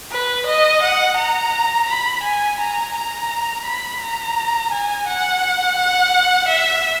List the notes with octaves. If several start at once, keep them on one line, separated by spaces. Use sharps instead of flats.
B4
D#5
F#5
A#5
B5
G#5
A#5
A#5
B5
A#5
G#5
F#5
F#5
E5